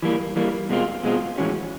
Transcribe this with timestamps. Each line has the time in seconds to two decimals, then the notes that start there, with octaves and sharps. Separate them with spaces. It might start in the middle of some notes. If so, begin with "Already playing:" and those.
0.02 E3 G3 A#3
0.36 E3 G3 A#3
0.69 B2 G#3 C4 F4
1.03 B2 G#3 C4 F4
1.38 A2 E3 G#3 C#4 F#4